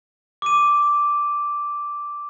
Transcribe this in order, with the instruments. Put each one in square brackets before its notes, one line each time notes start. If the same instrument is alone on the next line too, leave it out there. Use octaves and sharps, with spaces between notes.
[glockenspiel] D6 D#7